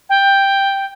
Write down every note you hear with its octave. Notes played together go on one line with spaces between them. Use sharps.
G5